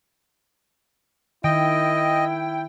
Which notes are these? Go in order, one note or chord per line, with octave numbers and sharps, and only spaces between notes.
D#3 E4 D#5 G5